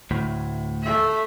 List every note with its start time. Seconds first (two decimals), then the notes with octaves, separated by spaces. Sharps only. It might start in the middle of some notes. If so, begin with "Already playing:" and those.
0.11 D2 A2
0.83 A3 E5